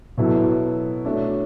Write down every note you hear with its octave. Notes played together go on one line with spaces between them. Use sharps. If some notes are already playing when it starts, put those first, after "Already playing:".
B2 F#3 B3 E4 A4
A3 D4 F#4 C#5 E5